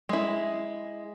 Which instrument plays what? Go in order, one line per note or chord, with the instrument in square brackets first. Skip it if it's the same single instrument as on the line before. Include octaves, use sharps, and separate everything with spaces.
[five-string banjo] G#3 E4